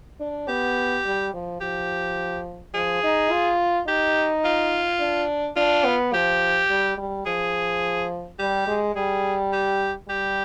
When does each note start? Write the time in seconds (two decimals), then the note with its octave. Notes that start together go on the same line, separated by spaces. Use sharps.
0.20 D4
0.48 B3 G4
1.05 G3
1.33 F3
1.61 F3 G4
2.74 F3 G#4
3.03 D#4
3.30 F4
3.87 D#4 G4
4.45 F4
5.00 D4
5.56 D4 F4
5.85 B3
6.14 F3 G4
6.70 G3
6.97 G3
7.26 F3 G#4
8.39 G3 G4
8.67 G#3
8.95 G3 G#4
9.52 G4
10.08 G3 G4